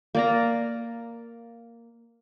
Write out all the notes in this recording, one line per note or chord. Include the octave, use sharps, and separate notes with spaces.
A#3 D5 A#5